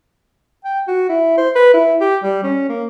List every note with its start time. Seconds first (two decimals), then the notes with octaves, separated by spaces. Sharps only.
0.65 G5
0.88 F#4
1.09 E4
1.38 C5
1.56 B4
1.73 E4
2.01 G4
2.23 G3
2.44 C#4
2.69 A#3